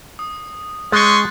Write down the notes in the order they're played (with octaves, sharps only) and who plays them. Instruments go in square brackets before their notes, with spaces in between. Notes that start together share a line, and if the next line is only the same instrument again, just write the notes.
[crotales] D#6
[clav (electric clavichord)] G#3 [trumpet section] C#4 C6 C#6 [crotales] F#6 G6 A6